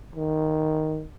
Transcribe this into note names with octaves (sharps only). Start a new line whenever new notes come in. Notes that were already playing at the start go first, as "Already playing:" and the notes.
D#3